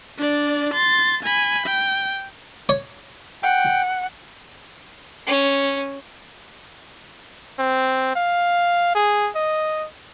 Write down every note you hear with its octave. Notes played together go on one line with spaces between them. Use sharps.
D4 D5
C6 A6
G#5 B5
G5
C#5
F#5 G5
C#4
C4
F5
G#4
D#5